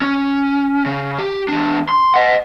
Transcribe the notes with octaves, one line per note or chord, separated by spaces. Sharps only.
C#4
C#3
G4
E2 D4
C6
D#5 F#5